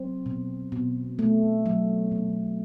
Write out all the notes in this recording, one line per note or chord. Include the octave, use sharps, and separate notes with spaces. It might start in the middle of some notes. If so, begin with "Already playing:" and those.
Already playing: F#3 C4
B2
B2
A3
F#3
B2